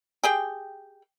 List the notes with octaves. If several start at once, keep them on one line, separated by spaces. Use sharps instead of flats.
G4 G#4 G5